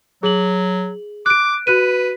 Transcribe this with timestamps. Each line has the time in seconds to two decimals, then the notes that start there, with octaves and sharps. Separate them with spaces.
0.23 F#3 G#4 F#7
1.26 D6 F#6 D7
1.67 F#4 B4 F#6 D#7